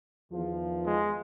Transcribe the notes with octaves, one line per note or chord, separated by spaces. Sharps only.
E2 D#3 F3
G#3